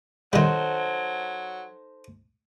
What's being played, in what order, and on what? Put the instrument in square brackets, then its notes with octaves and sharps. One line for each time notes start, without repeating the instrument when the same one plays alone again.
[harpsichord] D#3 G3 [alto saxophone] F#3 [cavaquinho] D#4 A4 C5